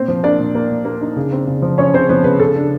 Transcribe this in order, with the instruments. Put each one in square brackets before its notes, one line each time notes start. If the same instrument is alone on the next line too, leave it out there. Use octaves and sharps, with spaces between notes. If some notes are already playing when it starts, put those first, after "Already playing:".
Already playing: [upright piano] A#2 C4 C5
F3
A#3 D4 D5
A#2
A#3
A#2
A#3
D#4
C#3
C4
C#3
F3
F3 C#4 C#5
C#3 C4 C5
F3 B3 B4
C#3 B3 B4
C#3 A4
D4